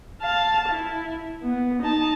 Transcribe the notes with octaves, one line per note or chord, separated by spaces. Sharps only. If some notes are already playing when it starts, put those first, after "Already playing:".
F5 A5
E4
B3
D#4 A5